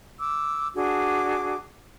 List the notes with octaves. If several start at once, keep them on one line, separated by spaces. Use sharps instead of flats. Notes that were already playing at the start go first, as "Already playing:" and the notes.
D6 E6
D4 F#4 G#4 D6